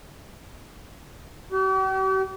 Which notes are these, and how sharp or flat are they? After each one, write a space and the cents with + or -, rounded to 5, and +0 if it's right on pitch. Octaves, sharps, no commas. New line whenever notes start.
G4 -45